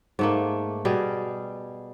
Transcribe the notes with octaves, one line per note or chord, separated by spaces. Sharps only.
G#2 A3 A#3
B2 G3 G#4